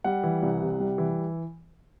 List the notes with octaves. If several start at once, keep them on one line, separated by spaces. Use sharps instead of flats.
G3 F#5
E3
C2
C3
G3
E3